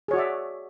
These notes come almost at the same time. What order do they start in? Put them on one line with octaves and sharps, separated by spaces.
G#4 C#5 F#4 D5 E5